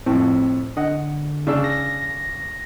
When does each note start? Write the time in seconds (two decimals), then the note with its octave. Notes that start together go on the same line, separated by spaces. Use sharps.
0.06 F2 A2 C4
0.77 D3 D#5 F#5
1.47 C#3 D4 E6
1.64 A#6